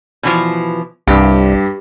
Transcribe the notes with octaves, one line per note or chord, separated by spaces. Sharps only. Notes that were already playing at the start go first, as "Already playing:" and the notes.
B2 E3 F3
C2 G2 G4